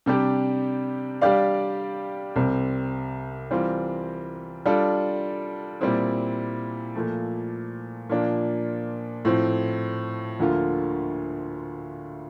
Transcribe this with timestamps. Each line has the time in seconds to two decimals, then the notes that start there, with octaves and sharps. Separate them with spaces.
0.06 C3 G3 D4 G4
1.21 G3 D4 G4 D5 F5
2.36 C2 C3 G3 C4
3.51 E3 G3 C4 F4
4.66 G3 D4 F4 A4
5.81 A#2 G3 C4 E4
6.96 A#2 F3 A3
8.09 A#2 F3 A#3 D4
9.25 A2 F3 C4
10.39 D2 D3 F3 A#3 F4